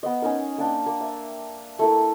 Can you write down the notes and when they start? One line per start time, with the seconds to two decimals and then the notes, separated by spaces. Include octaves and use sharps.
0.03 B3 D#5
0.22 C#4 D#4 A#4
0.58 A#3 D4 G5
0.86 A#3
1.00 E5
1.79 A3 E4 A#4